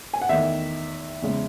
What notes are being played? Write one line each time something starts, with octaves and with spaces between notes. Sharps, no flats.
G#5
F#5
E2 D#3 A3 E5
E2 C#3 G#3